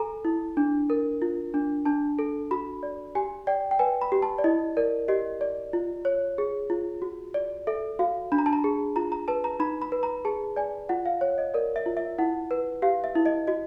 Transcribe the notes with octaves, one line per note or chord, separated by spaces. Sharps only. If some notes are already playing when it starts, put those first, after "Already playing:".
Already playing: A4 G#5 A#5
E4
D4
A#4
F4
D4
D4 A5
A4
F#4 B5
D5
G4 G#5
D5 G5
G5
B4 G#5
B5
G4
A5
D5
E4 D#5
A#4 D5
G4 D#5
D5
F4
C#5
G#4
F4
F#4
D5
A4 E5
F#4 F5
D4 B5
A#5
A5
A#5
G#4
F4 A#5
A#5
B4 A5
A#5
D#4 B5
B5
B4
A#5
G#4 A5
D5 G#5
F4 F#5
F5
C#5
D#5
A#4 D5
E5
F4
E5
E4 F#5
B4
G4 F5
E5
E4
D#5
F#4 D#5